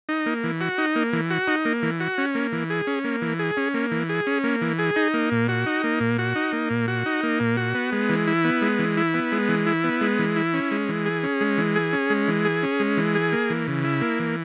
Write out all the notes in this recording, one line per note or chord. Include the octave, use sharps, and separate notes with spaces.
D#4
A#3
E3
F#4
D#4
A#3
E3
F#4
D#4
A#3
E3
F#4
C#4
A#3
E3
G#4
C#4
A#3
E3
G#4
C#4
A#3
E3
G#4
C#4
A#3
E3
G#4
D#4
A#3
A#2
F#4
D#4
A#3
A#2
F#4
D#4
A#3
A#2
F#4
D#4
A#3
A#2
F#4
B3
G#3
E3
E4
B3
G#3
E3
E4
B3
G#3
E3
E4
B3
G#3
E3
E4
C#4
G#3
E3
G#4
C#4
G#3
E3
G#4
C#4
G#3
E3
G#4
C#4
G#3
E3
G#4
A#3
E3
C#3
E4
A#3
E3